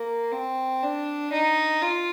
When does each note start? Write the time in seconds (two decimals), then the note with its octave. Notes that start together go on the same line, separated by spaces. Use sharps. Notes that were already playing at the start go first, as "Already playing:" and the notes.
Already playing: A#3
0.32 C4
0.83 D4
1.33 D#4
1.82 F4